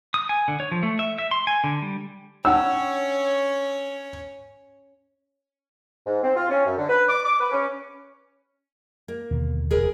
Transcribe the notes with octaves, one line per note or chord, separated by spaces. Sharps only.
D#6
G#5
D3
C#5
F3
A3
E5
E5
C6
G#5
D3
G3
C#4 D4 C#5 F#5 G5 E6
G#2
C4
F4
C#4
F#2
D3
B4
D6
D6
B4
C#4
A#3
D#2 B2 D3
F1 E2 G#4 A#4 B4